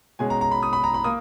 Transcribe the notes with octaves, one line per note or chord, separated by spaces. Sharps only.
B2 G#3 C#4 G#5
A#5
A#5
B5
D#6
B5
A#5
B5
A#3 D#6